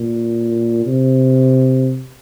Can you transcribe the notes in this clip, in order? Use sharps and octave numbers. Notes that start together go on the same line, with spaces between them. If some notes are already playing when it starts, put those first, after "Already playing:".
Already playing: A#2
C3